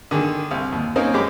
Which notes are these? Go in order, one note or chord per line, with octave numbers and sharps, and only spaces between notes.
D3 D#3 G#4
C2
D#2
A#3 C4 C#4 D#4 A#4
F#2 G#3 G4 B5 D6